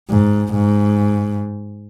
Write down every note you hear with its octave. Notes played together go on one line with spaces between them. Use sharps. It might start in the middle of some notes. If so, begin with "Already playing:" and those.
G#2
G#2